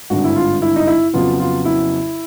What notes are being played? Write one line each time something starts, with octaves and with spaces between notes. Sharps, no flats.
G#1 G2 D3 F#4
E4
F4
E4
D#4
E4
F2 C#3 F#3 B3 F4
F4
E4